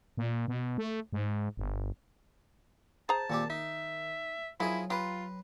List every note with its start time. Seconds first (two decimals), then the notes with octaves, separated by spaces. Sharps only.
0.17 A#2
0.48 B2
0.78 A3
1.13 G#2
1.57 G1
3.09 G#4 C5 A5 A#5
3.30 A#2 D#3 C4 G4
3.50 D#4 E5
4.60 D#3 F3 F#3 E4 G#4 D#5
4.90 F4 G4 B4 A#5 C6